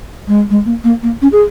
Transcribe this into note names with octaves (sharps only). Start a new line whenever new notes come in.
G#3
G#3
A#3
A#3
A#3
C#4
G#4